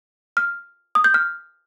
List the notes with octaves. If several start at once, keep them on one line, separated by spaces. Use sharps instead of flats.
F6
D#6
G6
F6